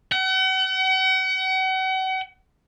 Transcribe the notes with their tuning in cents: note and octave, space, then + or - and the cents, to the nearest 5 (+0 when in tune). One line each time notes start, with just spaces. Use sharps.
F#5 +40